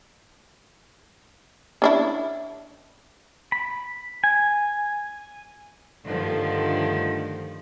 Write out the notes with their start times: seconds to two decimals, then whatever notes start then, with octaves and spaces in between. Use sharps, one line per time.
1.82 C#4 D4 E4
3.52 B5
4.24 G#5
6.05 G2 D3 D#3 F3 A3